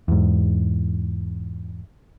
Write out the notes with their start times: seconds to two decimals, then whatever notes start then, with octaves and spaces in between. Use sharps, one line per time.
0.08 E2 G#2